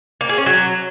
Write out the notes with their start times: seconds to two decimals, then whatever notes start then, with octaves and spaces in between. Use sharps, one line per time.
0.21 A#3
0.29 G#4
0.38 C#4
0.46 F#3